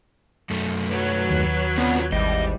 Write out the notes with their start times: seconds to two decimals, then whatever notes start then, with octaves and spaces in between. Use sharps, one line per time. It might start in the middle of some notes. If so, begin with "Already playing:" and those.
0.50 F#2 A3
0.89 F#3 C#4 B4
1.30 D#2
1.78 B3 C4 D4 F4
2.12 G#1 E3 G3 D#5